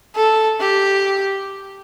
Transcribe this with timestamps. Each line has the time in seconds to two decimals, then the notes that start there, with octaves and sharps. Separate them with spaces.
0.15 A4
0.59 G4